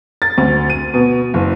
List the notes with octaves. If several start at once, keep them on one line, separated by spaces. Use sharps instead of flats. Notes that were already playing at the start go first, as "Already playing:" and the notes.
A6
D2
D#7
B2
F#1